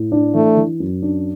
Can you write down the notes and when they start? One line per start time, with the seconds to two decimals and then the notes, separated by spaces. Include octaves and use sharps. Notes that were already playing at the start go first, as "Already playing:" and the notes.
Already playing: A2
0.12 D4
0.34 E3 A3
0.57 E3
0.80 F#2
1.02 D4